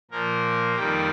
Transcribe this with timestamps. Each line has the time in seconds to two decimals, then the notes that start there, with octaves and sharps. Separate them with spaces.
0.11 A#2 F3 A#3 A#4
0.75 F2 D#3 G3 A#3 G4